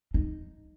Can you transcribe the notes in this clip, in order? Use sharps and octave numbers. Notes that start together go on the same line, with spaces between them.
D#4